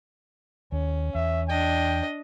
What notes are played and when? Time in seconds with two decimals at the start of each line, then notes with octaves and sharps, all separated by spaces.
0.72 D#2 C#4
1.15 E2 E5
1.49 D4 D#5 G5